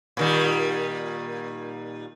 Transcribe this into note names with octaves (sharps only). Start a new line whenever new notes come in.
A#2 D#3 G3